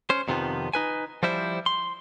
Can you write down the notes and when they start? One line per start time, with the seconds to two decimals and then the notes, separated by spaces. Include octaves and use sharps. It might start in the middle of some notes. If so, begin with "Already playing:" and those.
0.10 C#4 C5
0.28 F2 C3 D#3 F3 B3
0.74 D#4 B4 G#5
1.23 F3 G3 E4 C5
1.66 C6